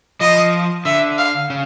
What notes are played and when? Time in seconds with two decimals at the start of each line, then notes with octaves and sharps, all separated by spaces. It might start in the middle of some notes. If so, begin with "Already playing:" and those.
0.21 F3 D#5
0.85 D3 E5
1.18 F5
1.50 C#3